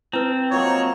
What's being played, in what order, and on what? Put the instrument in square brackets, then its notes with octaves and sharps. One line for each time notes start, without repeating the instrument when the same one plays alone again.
[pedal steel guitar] C4 [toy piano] E4 B4 [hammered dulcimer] A5
[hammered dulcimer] F3 F#3 A#3 [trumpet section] C#5 D#5